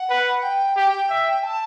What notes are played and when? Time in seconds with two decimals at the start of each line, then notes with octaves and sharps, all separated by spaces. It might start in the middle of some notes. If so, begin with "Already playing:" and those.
Already playing: F#5
0.10 B4
0.43 G5
0.77 G4 G5
1.10 E5
1.43 A5